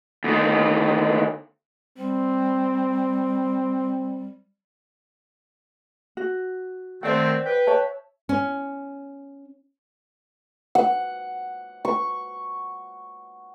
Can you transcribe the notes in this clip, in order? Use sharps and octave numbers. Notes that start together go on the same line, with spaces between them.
D2 D#3
G3 C4
F#4
D#3 A3 C4 C5 D5 F#5
B4 G5
C#5 E5 A5
C#4
F#5
C#6